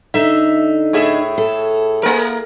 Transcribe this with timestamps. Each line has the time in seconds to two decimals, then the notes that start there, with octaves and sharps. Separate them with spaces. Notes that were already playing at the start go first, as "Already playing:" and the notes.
0.14 D3 D#4 E5
0.93 A2 G#4 E5
1.38 A4
2.03 A#3 A#4